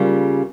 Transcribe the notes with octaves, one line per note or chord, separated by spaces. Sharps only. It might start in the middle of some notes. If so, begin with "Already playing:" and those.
Already playing: C#3 G3 A#3 F4